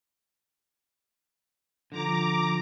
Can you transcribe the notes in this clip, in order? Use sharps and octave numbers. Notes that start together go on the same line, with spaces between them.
D3 F3 A#5 D6